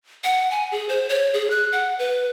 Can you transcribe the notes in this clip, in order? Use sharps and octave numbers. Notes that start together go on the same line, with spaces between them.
F#5
G#5
G#4
C5
C#5
G#4
F#6
F#5
B4